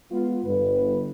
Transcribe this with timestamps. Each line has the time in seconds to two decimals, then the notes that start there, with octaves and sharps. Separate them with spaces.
0.11 G#3 B3 F4
0.43 G1 B4